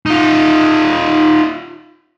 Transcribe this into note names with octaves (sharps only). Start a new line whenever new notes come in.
D#4 F4